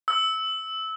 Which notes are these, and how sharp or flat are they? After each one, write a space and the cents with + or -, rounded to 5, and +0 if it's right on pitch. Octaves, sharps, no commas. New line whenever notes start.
E6 -20